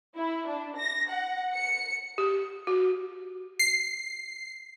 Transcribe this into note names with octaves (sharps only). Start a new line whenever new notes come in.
E4
D4
A#6
F#5
C#7
G4
F#4
C7